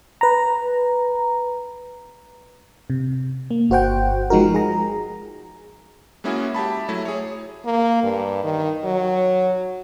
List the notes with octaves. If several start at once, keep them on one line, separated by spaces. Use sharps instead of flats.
B4 A#5
C3
A#3
G1 F#4 C5 F#5 G5
F3 G#3 D#4 F#4 A#4
G#4 A#5
G#3 A#3 C#4 E4 F#4 G#4
G4 E5 A5 B5
F#3 A3 E4
G#4 C#5
A#3
G2
D#3
F#3